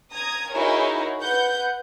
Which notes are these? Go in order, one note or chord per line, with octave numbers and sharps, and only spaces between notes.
A#5 D#6 G#6
D#4 E4 F#4 G#4 A#4 C#5
B4 F#5 G6